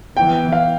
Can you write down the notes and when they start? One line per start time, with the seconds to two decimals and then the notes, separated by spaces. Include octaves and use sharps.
0.17 E3 B3 G5
0.52 F5